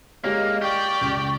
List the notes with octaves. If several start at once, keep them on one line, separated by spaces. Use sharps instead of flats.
G#3 A#3 G4 C#5 D#5
G4 D5 G5 C#6 F6
C#2